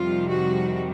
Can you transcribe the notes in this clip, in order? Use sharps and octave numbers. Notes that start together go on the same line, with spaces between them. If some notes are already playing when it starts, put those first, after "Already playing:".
Already playing: F2 C3 D#3 G3 F4
F#4